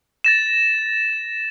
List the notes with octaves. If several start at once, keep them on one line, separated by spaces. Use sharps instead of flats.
A6 A#6 E7